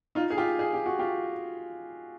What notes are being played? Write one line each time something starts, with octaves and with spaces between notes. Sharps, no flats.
D#4 F4
G#4
F4 G4
G#4
G4
F#4
F4 G4